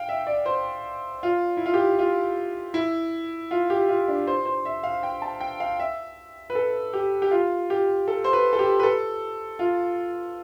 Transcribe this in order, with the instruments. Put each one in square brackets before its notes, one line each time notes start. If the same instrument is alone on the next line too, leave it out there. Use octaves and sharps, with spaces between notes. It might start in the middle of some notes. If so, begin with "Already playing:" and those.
Already playing: [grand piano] F5 G5
E5
D5
C5
F4
E4
F4
G4
F4
E4
F4
G4
F4
D4
C5
C5
E5
F5
G5
A5
G5
F5
E5
B4
A4
G4
G4
F4
G4
A4
C5
B4
A4
G4
B4
A4
F4